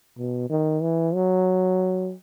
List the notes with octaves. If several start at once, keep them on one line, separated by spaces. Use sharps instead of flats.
B2
D#3
E3
F#3